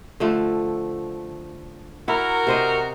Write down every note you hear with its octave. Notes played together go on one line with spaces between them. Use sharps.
D3 F3 A3
E4 F#4 A#4
C3 C5 D#5